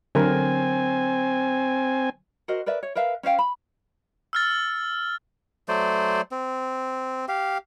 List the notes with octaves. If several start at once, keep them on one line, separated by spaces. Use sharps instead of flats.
D3 F#3 C4 A#4 G#5
F#4 A#4 C5 D#5
A#4 B4 D5 E5
C#5
A#4 B4 E5 F5
C#4 C5 F5 G5
B5
E6 F6 A6
F#3 A3 C5 D5
C4
G4 F5